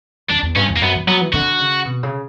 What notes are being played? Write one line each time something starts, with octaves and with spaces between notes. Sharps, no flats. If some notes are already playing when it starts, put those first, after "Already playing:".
E2 D4
E2
G2 C#4
E2
A#3
F#2 B3
E3
F#3 B3
E3
D3 F#4
C#3
B2
C#3